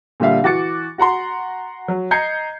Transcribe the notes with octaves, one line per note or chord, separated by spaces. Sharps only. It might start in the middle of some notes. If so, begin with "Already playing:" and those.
A#2 D3 G3 E5 F5
E3 F#4 D6 A6 C#7
F#4 F#5 A#5 C6
F#3
D#5 A#5 G6 G#6 C7 C#7